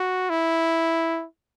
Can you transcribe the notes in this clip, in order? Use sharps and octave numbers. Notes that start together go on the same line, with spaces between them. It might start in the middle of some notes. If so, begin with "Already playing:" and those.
Already playing: F#4
E4